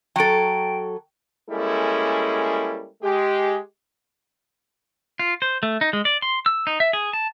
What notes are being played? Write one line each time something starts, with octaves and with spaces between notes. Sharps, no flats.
F#3 A4 G5 D7
G3 G#3 A#3 C#4 E4 A4
G#3 G4
F4
C5
A3
D#4
G#3
D5
C6
E6
D#4
E5
G#4
A5